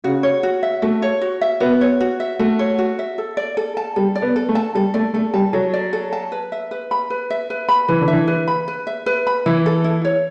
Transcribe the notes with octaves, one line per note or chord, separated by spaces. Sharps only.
C#3 F#4
C#5
F#4
E5
A3 F#4
C#5
F#4
E5
B3 F#4
C#5
F#4
E5
A3 F#4
C#5
F#4
E5
A4
D5
A4
A5
G3 A4
D5
B3
A4
A3
A5
G3 A4
A3 D5
A3 A4
G3 A5
F#3 A4
D5
A4
A5
B4
E5
B4
B5
B4
E5
B4
B5
E3 B4
D3
E5
E3
B4
B5
B4
E5
B4
B5
E3 E4
A4
E4
C#5